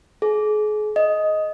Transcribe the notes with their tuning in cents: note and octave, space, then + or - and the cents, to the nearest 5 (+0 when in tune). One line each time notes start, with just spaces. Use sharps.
G#4 +35
D#5 +5